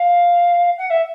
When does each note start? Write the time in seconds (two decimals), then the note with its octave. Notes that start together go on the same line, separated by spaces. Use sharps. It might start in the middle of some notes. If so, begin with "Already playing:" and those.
Already playing: F5
0.78 F#5
0.90 E5